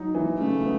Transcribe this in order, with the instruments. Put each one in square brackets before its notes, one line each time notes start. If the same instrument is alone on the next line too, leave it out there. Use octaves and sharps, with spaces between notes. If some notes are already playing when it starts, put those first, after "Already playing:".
Already playing: [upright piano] F#3 D#4
E3
[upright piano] C#3 [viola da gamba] A3
[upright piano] B3